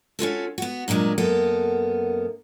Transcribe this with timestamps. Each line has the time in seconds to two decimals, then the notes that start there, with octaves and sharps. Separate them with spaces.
0.19 C#4 F4 F#4 A4
0.58 B3 F#4
0.88 G2 A#2 F#3 G#3 D5
1.18 F#2 A#3 B3 A4